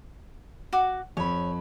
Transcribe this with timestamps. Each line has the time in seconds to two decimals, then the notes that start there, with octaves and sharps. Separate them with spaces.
0.73 F#4 D6
1.17 F2 C#5 B5